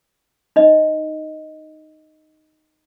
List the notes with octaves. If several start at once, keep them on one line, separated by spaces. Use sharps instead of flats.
D#4 D#5